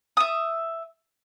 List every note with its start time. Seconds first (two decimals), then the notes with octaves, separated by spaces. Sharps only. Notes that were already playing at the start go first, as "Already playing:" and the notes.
0.17 E5 D#6